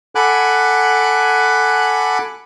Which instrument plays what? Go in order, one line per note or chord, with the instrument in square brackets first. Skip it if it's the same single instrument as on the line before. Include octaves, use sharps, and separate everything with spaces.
[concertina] A4 F#5 G#5 B5 D6 F#6